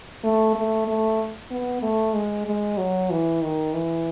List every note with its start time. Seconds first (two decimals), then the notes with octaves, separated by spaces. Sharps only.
0.24 A3
0.55 A3
0.88 A3
1.51 B3
1.82 A3
2.14 G#3
2.46 G#3
2.78 F#3
3.10 E3
3.42 D#3
3.73 E3